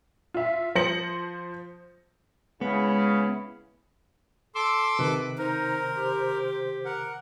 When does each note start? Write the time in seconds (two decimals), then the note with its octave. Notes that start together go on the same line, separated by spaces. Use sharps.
0.34 F4 E5
0.75 F3 C5 A#6 C#7 F#7
2.61 C#3 G#3 B3 E4
4.55 A4 C6 D6 E6
4.99 C3 D#3 B4
5.38 D#4 A#4 C5
5.96 G4
6.85 A#4 F#5